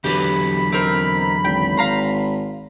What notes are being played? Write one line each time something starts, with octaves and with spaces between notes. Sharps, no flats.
E2 D3 F#3 G4 B4 B5
C4 D#4 A#4
G#1 G5
F5 A#5 C6